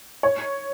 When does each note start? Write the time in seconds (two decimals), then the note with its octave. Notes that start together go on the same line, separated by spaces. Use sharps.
0.23 C#5